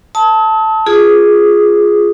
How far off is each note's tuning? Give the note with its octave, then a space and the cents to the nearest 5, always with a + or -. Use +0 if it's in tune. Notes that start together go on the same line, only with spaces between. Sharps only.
A5 +0 D#6 +45
F4 +0 G#4 +0 D#6 +0